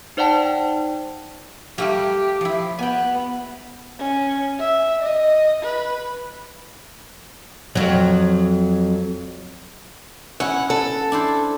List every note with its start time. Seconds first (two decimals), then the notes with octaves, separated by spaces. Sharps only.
0.17 D#4 C5 D5 F#5 G5 A5
1.78 G3 A3 A#3 G4
2.41 F3 E4
2.79 B3 G5 G#5
3.99 C#4
4.60 E5
5.02 D#5
5.63 B4
7.75 F2 F#3
10.40 C#4 E4 F#5
10.70 A4
11.12 D4 E4 C5